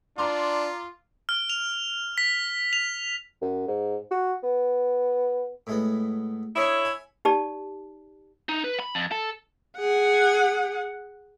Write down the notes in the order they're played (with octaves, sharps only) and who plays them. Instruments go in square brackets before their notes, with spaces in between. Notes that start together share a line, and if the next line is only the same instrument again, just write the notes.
[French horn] D4 [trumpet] F4 [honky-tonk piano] A#5 C6 D6
[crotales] F6
F7
B6
F7
[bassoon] F#2
G#2
F#4
B3
[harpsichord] A2 G#3 B3
[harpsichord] D4 A4 D#5 [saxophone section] E4 C#5
[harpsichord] G#5
[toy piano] D#4 G4 D5 A5
[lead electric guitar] D#4
B4
B5
F2
A4
[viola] G#4 F#5